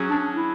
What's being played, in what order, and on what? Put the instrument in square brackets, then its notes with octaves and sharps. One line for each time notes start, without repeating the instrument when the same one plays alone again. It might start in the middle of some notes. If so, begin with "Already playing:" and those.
Already playing: [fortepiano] F#3 C#4 G#4
[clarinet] D4
E4